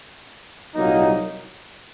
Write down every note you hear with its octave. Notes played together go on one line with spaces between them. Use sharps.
C2 A#2 F#3 A#3 D#4